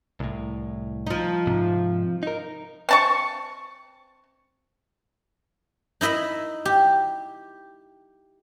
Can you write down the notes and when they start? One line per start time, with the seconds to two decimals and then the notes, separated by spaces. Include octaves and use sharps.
0.20 C2 A2
1.07 F3 D#4
1.47 G#2 C3
2.23 D#4 A#4
2.89 C4 A5 C#6
6.01 D#4 E4 D#5 E5 B5
6.65 G4